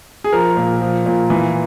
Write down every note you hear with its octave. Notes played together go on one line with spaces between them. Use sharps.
G#4
F3 A#4
A#2
F3
A#2
E3